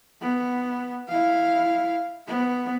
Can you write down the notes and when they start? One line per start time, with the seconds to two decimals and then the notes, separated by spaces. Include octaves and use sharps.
0.21 B3
1.09 E4 F5
2.27 B3